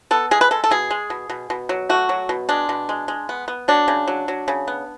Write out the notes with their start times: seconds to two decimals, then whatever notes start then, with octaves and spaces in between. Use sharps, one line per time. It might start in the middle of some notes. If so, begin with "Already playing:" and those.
0.11 B3 A4
0.31 G#3 G#4
0.41 B4
0.51 G#3 A4
0.64 A4
0.71 B2 G#4
0.90 G#3
1.10 B2
1.30 B2
1.50 B2
1.69 F#3
1.89 A3 F#4
2.09 F#3
2.29 B2
2.49 G#3 D4
2.69 B2
2.89 G#3
3.08 G#3
3.29 B3
3.48 B3
3.68 F#3 D4
3.88 C#3
4.08 F#3
4.28 F#3
4.48 C#3
4.68 B3